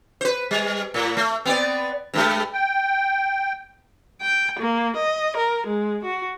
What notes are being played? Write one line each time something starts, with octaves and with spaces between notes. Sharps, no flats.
B4 C5
G3
A2
A3
B3 C4 D5
G2 F#3 G#3
G5
G5
A#3
D#5
A#4
G#3
F#4